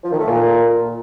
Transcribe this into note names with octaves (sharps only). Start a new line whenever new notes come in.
F3
D#3
A3
A#2